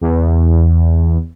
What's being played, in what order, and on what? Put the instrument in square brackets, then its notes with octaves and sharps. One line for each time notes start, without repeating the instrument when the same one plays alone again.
[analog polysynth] E2